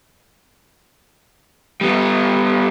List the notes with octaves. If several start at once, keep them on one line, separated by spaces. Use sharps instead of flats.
G3 B3